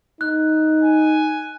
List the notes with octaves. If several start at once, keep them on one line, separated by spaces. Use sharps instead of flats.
D#4 F#6
G#5